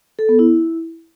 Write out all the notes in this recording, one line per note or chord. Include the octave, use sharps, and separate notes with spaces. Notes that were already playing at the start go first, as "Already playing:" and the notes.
A4
B3
E4